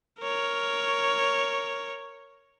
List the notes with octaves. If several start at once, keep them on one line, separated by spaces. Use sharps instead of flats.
A#4 C#5